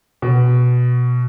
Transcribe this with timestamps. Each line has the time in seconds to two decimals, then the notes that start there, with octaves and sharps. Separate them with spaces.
0.22 B2